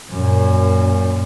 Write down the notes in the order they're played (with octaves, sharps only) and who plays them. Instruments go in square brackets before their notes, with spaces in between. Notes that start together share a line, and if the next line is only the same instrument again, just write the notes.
[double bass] F#2 A#2